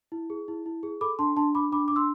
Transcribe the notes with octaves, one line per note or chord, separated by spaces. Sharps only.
E4
G#4
E4
E4
G#4
A4 B5 D6
D4 A5 C6
D4 A5 C6
D4 B5 D6
D4 B5 D6
D4 D6
C6 E6